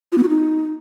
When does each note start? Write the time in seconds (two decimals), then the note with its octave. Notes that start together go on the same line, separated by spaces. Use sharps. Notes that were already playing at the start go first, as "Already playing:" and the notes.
0.12 F4
0.18 B3
0.23 F#4
0.29 D#4